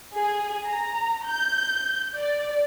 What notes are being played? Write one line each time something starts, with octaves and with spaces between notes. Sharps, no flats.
G#4
A#5
G6
D5